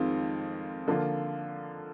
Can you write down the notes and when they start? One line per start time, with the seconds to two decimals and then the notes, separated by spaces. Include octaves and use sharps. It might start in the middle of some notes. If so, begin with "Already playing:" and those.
Already playing: F2 D#3 G#3 C4 F4
0.88 D3 F3 A#3 F4